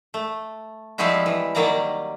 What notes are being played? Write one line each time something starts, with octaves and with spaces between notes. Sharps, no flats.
A3
F3 G3 G#3 C4 E4 F#4
E3
D#3 F#3 G3 A#3 D5 A#5